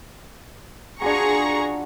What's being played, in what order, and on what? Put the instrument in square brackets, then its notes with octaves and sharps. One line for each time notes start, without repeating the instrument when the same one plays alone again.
[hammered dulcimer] D4 F4 F#4 [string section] G#4 A#5 C#6